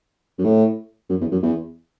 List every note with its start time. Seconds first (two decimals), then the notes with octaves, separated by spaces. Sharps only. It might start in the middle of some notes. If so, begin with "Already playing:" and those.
0.39 F#2
0.44 A2
1.10 F#2
1.21 E2
1.32 F#2
1.43 E2